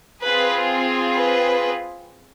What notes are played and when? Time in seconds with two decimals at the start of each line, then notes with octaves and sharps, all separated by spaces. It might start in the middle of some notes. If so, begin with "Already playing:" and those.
0.23 C4 F4 G#4 B4
1.15 B4